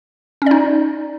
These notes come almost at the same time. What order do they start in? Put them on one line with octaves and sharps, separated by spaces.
C#4 D5 D#4